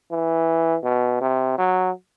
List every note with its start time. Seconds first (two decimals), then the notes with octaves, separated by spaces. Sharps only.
0.11 E3
0.83 B2
1.21 C3
1.58 F#3